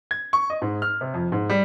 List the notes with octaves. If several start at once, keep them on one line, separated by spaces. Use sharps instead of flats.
G#6
C#6
D#5
G#2
F6
C3
F2
G#2
G3